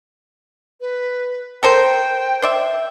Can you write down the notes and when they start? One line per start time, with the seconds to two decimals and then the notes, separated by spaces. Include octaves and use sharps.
0.81 B4
1.63 A4 A#4 C5 G5
2.42 C5 D5 E5